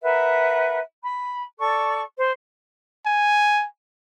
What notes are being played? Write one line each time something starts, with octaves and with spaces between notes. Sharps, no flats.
A#4 B4 E5 F#5
B5
A4 D5 C#6
C5
G#5